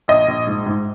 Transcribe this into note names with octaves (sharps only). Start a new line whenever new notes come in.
A#1 D#5
A#1
G#2
G#2